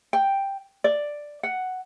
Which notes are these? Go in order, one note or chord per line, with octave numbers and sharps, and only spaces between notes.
G5
D5
F#5